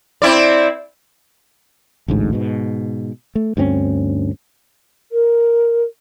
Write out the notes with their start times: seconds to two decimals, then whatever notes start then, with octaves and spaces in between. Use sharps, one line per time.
0.22 C4 E4 D5
2.08 A1 D2 G#2
2.33 G#2 B2
3.35 A3
3.57 D2 G2 C4 C#4
5.12 A#4